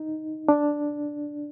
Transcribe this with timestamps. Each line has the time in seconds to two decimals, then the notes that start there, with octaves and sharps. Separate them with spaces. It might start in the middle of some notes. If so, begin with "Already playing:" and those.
Already playing: D#4
0.48 D4